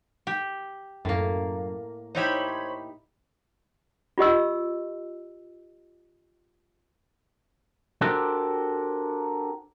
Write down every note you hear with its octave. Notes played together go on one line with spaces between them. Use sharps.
G4
F#2 A2 A#3
D#4 E4 G4 C5 C#5 B5
F4 G4 D#5 E6
D4 F#4 G4 A4 A#4 C5